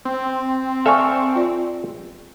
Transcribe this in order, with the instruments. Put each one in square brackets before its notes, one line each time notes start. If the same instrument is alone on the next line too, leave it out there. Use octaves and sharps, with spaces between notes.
[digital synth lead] C4
[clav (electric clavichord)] A4 E5 F5 [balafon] D5 G#5 C#6
[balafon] F4 D5